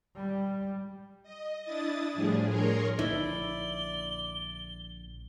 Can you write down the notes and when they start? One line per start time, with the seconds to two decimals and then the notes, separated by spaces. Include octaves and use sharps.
0.16 G3
1.23 D#5
1.63 D4 E4 D#6 A6
2.12 A2 F3 G3 D4 G#4
2.47 G#4 A#4 C#5 A#5 C6
2.99 A#1 D3 E4 D5 G7